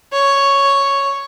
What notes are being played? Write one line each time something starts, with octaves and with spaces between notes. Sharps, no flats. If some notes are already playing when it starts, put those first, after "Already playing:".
C#5